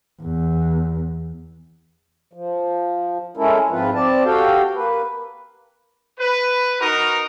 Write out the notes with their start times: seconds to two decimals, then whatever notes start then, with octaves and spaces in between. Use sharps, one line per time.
0.22 E2
2.33 F3
3.37 G#3 C#4 E4 A4 A#4
3.70 G#2 F3 C4 F4 B4
3.94 C4 D5 A5
4.25 F#4 G4 A4 F5 G5
4.75 A#3 B4
6.18 B4
6.80 D#4 F#4 A#4